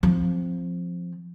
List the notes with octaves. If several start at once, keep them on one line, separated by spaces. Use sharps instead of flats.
F3 C4